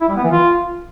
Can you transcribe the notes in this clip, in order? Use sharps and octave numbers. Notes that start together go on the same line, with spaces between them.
E4
G3
B3
E3
F4